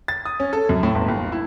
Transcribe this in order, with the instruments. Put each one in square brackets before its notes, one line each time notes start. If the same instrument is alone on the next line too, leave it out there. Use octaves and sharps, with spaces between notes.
[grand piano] A6
D#6
C#4
A4
F#2
A2
G1
D#2
E4